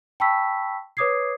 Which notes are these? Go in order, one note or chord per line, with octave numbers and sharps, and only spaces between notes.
G5 A5 B5 C#6 E6 B6
B4 C#5 D6 D#6 G#6 C7